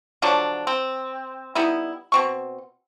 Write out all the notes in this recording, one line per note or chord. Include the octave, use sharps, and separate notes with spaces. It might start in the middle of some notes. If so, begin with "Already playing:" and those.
D3 F3 F#3 D4
C4
G3 B3 D#4 E4
B2 C4 C#6